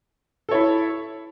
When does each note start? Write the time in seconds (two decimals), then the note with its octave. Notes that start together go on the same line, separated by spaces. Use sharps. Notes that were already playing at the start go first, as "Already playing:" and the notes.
0.49 A4
0.51 C#5
0.54 E4